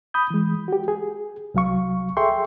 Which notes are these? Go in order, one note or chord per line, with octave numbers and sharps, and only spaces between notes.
B5 D#6 G6
E3 G#3
F#4 G4
G#4
C2 F#3 F5 C#6
G#4 A4 E5 G5 C6 C#6